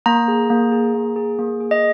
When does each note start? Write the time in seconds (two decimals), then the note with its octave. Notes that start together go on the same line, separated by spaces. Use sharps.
0.06 A#3 A#5
0.28 G#4
0.50 A#3
0.72 G#4
0.94 A#3
1.16 G#4
1.39 A#3
1.60 G#4
1.71 D#5